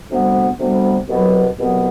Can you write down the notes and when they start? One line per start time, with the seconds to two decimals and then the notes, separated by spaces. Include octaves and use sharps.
0.10 D2 C3 G3 B3
0.59 D2 C3 G3 B3
1.08 C2 B2 F#3 B3
1.57 C2 B2 F#3 B3